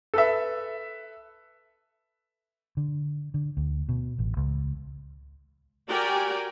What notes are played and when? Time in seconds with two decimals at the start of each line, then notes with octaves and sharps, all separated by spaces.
0.14 A4 B4 E5
2.77 D3
3.34 D3
3.57 D2
3.89 B2
4.19 A1
4.37 C#2
5.88 F#4 G4 A#4 D5 G5 G#5